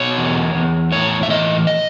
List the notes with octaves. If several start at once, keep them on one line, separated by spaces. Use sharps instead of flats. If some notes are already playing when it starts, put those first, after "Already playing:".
Already playing: B2 C#5
E2
E2
A2 C#5
E5
E3 D#5
D#5